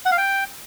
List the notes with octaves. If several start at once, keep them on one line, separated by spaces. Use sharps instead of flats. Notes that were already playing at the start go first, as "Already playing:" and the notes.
F#5
F5
G5